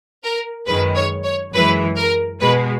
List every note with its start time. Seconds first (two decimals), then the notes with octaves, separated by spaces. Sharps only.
0.24 A#4
0.66 F#2 D#3 G#3 B4
0.96 C#5
1.25 C#5
1.53 F#2 E3 G#3 B4
1.97 A#4
2.40 B2 G#3 B4